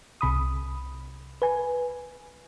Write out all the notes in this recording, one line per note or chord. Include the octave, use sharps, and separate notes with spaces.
C2 C3 B5 D#6
B4 G#5